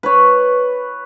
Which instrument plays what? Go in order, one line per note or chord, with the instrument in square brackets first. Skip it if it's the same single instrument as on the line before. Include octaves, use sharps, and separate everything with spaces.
[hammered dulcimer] B4 C#5